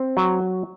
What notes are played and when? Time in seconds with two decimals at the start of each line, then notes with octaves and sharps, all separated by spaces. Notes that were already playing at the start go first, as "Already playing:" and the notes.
Already playing: C4
0.17 F#3